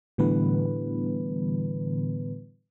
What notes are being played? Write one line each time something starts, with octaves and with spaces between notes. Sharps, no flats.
A2 D3 E3 G3 B3 B4